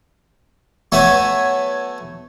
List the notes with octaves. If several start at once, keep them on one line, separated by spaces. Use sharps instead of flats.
F#3 A3 B3 E5 G#5